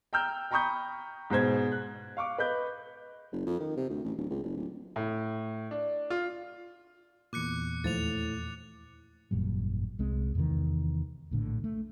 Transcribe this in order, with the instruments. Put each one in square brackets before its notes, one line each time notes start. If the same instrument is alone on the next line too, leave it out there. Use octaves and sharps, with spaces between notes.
[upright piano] G5 A#5 E6 F6 G6
G5 A#5 B5 C#6 D#6 G6
G#2 B2 C5 G#6
F#6
F5 C#6 D6
B4 D#5 G6
[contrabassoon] F#1
F2
D#3
C3
D2
A1
D1
C#2
F#1
D1
[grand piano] A2
D4
F4
[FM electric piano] E2 A#2 [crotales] D6 F#6 C#7
[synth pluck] D#2 F3 [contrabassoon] A2 [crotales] A6 F7
[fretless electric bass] G#1 F#2 A#2 G3
C2 G#3 C4
E2 C3 D#3
A#1 A2 D3
A3